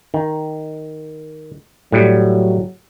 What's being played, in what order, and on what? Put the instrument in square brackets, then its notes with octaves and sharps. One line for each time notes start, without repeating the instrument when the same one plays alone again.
[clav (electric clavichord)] D#3
[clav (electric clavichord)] A2 G3 [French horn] F#3